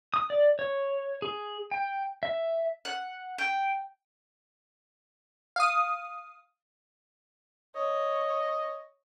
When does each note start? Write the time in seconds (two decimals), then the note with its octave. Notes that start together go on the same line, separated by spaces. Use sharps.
0.14 D#6
0.30 D5
0.59 C#5
1.22 G#4
1.71 G5
2.23 E5
2.85 F#5
3.38 G5
5.56 F5 D#6
7.76 C#5 D#5